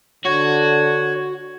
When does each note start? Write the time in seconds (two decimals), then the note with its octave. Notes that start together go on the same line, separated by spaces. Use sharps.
0.25 D3 F#4 C#5